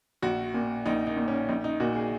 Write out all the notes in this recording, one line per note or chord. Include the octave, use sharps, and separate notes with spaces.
A#1 F#4
A#2
A#1 D#4
D#4
A#2
C#4
A#1 D#4
D#4
A#2 F#4
G#4